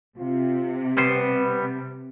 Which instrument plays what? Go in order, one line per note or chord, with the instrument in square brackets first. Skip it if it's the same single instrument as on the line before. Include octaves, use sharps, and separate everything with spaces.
[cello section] C3 [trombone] F4
[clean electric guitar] G3 B3 C5 [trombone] B4